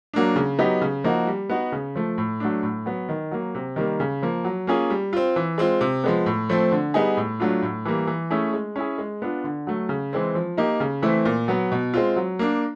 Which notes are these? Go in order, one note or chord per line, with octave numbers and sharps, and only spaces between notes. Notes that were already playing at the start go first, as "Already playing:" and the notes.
F#3 A#3 D4
C#3
F#3 B3 D#4 G4
C#3
F3 A#3 D#4 F#4
G3
B3 D#4 F#4
C#3
F3 A3
A2
F#3 A3 D4
A2
F#3 B3
D#3
F#3 A#3
C3
D#3 G3 A#3
C#3
F3 A#3
F#3
A#3 C#4 F4 G#4
G3
C4 F4
E3
G#3 C4 F4
C3
F3 G#3 B3
A2
F3 A3 C4
D3
G3 B3 D#4 G#4
A2
F#3 A3 D4 F4
A2
E3 G3 A#3
E3
A3 C#4 E4 G#4
G#3
C#4 E4 G#4
G#3
B3 D4 F4
D3
F#3 A3
C#3
E3 G#3 C4
F3
A#3 D#4 G4
C#3
E3 A3 C4 E4
A#2
F#3 B3
B2
G#3 C4 F4
F#3
A#3 D4